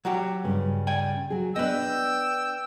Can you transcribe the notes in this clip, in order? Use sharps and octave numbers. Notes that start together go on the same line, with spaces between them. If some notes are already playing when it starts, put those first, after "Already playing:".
F#3 F#4 G4
G2 C#3
D5 G5 G#5
F#3 G#4
B3 D4 B4 D#5 G5 E6